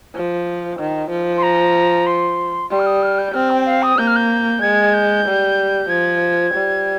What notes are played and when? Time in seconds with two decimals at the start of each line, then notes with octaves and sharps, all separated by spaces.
0.15 F3
0.79 D#3
1.10 F3
1.38 C6
1.43 A#5
2.06 C6
2.70 G3 C6
2.79 F6
2.86 D#6
3.02 F6
3.18 G6
3.34 C4 F6
3.50 G5
3.66 F5
3.83 D#6
3.98 A#3 G6
4.07 F6
4.16 G6
4.62 G#3 G#6
4.94 G6
5.26 G3
5.89 F3 G#6
6.54 G3